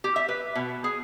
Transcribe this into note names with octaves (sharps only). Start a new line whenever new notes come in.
G4
E5
B4
B2
G#4